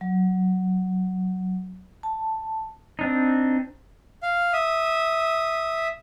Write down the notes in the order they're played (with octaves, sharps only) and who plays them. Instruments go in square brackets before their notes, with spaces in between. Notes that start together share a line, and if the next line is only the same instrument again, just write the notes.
[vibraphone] F#3
A5
[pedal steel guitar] C4 D4 D#4
[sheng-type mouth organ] F5
E5 D#6